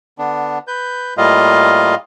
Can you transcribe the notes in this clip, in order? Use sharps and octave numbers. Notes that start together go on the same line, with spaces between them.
D3 B3 D4
B4 G6
A2 G3 A#3 F4 D#5 F5